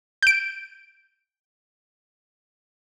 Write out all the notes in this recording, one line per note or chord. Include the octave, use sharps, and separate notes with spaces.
G6 D7